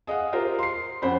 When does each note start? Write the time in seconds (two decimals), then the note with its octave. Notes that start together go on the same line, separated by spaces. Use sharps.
0.07 G#4 D#5 F5 F#5
0.33 F4 G4 A#4 C5
0.59 C6 C7
1.02 F2 C#4 C5 F#5 B5